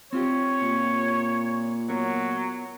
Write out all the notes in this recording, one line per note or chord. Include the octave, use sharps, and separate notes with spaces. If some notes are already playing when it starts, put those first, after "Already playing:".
C4 F4 G4 C#5
A#2
F#3 B3 A#4 C#5